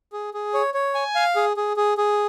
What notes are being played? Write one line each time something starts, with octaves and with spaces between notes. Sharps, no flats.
G#4
G#4
C#5
C#5
G#5
F5
G#4
G#4
G#4
G#4